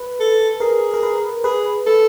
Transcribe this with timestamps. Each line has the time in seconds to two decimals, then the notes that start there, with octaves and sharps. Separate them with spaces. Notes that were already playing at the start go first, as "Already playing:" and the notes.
Already playing: B4
0.20 A4
0.60 G#4 A#4
0.94 A#4
1.03 B4
1.44 G#4 B4
1.86 A4